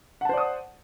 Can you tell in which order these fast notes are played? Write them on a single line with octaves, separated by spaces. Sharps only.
F#5 A5 C5 D5 D#6